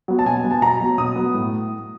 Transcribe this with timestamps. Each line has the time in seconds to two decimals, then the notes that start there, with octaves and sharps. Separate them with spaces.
0.08 F#3 B3
0.19 A5
0.26 B2 G#5
0.44 F#3 B3
0.51 A5
0.62 B2 A#5
0.81 F#3 B3
0.98 B2 D#6
1.16 F#3 B3
1.34 A2